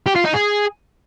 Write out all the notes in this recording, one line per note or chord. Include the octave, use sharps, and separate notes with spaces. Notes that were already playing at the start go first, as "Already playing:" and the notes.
G4
F4
D#4
G#4